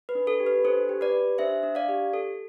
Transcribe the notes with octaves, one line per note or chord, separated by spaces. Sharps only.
B4
D4
A4
G4
B4
D4 A4 C5
G4
B4 D5
G4
D4 C5 E5
D4
D5 F5
G4
A4